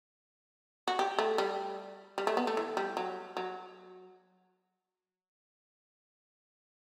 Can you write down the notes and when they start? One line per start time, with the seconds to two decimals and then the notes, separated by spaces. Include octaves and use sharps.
0.88 F#4
0.99 G4
1.19 A3
1.38 G3
2.18 G3
2.27 A3
2.37 B3
2.47 A3
2.57 E3
2.77 G3
2.97 F#3
3.37 F#3